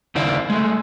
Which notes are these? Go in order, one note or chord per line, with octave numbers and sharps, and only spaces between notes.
D#2 C#3 E4 C5 D5 F5
G#3 A3